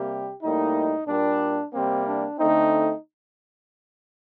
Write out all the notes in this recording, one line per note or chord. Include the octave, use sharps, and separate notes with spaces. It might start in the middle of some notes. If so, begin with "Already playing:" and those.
Already playing: C3 G3 A#3 G4
A2 G3 A#3 D#4
A#2 G3 A#3 D4
C3 G3 A#3 C4
D4
D3 A3 C4 D#4